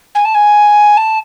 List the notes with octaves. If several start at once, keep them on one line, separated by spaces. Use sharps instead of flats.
G#5
A5
G#5
A5